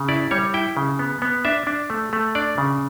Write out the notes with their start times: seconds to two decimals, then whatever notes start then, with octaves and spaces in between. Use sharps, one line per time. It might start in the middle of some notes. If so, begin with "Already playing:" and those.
Already playing: C#3
0.08 E4 D5
0.31 G3 C#5
0.54 E4 G5
0.77 C#3
0.99 B3
1.22 B3
1.45 D4 E5
1.67 D4
1.90 A3
2.13 A3
2.35 D4 D5
2.58 C#3